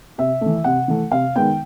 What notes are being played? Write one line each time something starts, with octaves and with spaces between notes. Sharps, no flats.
C3 E5
E3 A3
C3 F#5
E3 A3
C3 F5
D#3 G#3 B3 G5